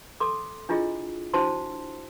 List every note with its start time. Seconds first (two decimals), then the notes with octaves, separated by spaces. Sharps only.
0.20 A4 C6 D6
0.69 D4 E4 F4 G#4 D#5
1.34 D4 E4 F#4 C5 A5 C6